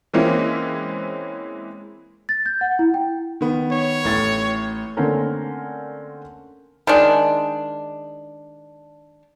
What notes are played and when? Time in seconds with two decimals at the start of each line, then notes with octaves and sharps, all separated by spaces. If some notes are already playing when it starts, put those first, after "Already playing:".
0.14 E3 G#3 A#3 C4 C#4 E4
2.29 A6
2.46 G6
2.61 F#5
2.79 E4
2.94 G5
3.41 D#3 B3
3.72 C#5
4.05 A1 A2 A6
4.97 D3 A3 A#3 C4 C#4 A#4
6.87 D#3 G#3 D4